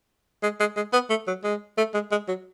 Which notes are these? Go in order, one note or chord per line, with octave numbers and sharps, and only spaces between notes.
G#3
G#3
G#3
B3
A3
F#3
G#3
A3
G#3
G#3
F#3